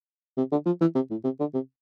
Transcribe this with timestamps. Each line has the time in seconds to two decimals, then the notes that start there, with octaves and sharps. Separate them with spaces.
0.38 C3
0.52 D3
0.66 F3
0.81 E3
0.95 C3
1.11 A2
1.24 C3
1.40 D3
1.54 C3